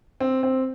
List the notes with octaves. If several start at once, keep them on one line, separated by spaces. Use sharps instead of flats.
C4
C4